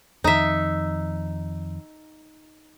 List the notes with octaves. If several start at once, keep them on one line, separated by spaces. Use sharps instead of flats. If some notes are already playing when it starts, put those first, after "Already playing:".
F2 D#3 D#4 E5